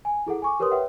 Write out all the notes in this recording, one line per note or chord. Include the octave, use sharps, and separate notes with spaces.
G#5
E4 G#4 A4 F#5
G#5 C#6 D6
G4 A#4 B4 C#5 C6 D#6
B4 C#5 E5 F#5 G5